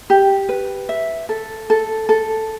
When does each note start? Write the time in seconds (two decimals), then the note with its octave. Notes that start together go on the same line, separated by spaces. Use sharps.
0.10 G4
0.49 B4
0.89 E5
1.29 A4
1.70 A4
2.09 A4